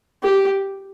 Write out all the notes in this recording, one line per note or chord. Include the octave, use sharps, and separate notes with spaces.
G4